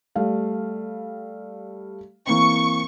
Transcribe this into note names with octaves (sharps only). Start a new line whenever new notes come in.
G3 A3 F5
E3 A#3 C4 C#6